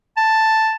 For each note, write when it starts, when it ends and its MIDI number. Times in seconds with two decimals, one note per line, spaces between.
0.17 0.76 81